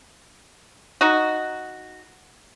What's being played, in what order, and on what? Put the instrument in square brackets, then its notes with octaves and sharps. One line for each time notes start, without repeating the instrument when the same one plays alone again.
[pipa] D#4 F#4